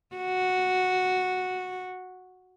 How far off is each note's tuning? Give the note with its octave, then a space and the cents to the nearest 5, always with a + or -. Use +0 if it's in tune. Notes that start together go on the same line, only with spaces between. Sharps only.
F#4 -5